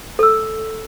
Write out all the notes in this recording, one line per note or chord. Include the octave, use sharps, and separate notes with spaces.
A4 E6